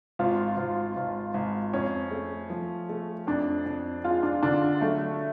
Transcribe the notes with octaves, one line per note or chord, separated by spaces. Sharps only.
G#1 F4
G#1
G#1
G#1
F2 C#4
A3
F3
A3
F2 D4
F2
G#3 F4
D4
D3 D4
F#3 A3